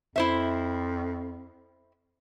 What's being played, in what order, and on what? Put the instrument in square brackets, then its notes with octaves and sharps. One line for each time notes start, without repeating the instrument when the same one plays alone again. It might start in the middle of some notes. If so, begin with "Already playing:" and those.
[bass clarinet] F2 [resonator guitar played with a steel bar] E4 C5 E5